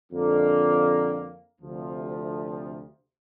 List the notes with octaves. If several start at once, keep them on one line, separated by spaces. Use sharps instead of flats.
F2 D3 A#3
D2 C3 F3